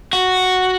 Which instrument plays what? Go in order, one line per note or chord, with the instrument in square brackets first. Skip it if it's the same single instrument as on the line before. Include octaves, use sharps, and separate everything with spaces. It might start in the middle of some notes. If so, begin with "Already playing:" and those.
[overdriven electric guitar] F#4